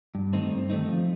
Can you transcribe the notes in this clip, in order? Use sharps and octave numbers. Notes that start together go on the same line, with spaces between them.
G2
D#3 A3 C4 D#4
G2
D#3 A3 C4 D#4
F3